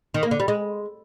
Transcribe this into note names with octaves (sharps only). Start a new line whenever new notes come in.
D#3
A#3
D3
G3
G#3